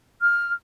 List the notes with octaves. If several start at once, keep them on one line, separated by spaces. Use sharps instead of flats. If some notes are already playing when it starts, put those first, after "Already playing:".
F6